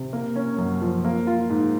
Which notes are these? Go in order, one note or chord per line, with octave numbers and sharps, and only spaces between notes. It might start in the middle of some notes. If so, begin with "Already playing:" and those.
Already playing: C3
A#3
C#4
F#2
F3
A#3
F4
G#2